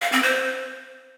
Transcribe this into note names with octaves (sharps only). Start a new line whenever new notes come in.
F5
C4
C5